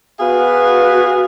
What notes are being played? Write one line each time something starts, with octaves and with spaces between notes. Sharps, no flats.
B3 F#4 G#4 B4 F5